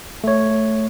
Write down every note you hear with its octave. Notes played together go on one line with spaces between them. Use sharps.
A3 C#5